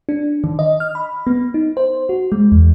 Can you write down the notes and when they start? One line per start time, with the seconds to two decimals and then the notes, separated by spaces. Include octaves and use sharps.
0.09 D4
0.44 D#3
0.59 D#5
0.80 F6
0.95 B5
1.27 B3
1.54 D#4
1.77 C5
2.09 F#4
2.32 G#3
2.52 E2